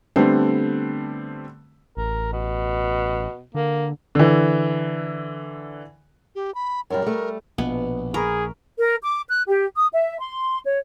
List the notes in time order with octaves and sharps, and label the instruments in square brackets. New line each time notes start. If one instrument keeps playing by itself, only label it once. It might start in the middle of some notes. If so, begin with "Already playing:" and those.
[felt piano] D3 G3 A3 B3 C4
[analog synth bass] A1 [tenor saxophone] A#4
[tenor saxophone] B2
[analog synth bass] D3 [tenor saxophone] A#3
[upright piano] D3 E3
[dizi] G4
B5
[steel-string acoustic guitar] F#2 G3 [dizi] A#4
[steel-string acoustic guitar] G3 A3
[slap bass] A#1 [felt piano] B2 [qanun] B3
[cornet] G#4 [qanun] A#4 [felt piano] A#5 B5 C#6
[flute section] A#4
D6
F#6
G4
D#6
E5
C6
C#5